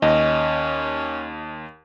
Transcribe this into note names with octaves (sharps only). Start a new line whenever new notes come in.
D#2 C#4 D#5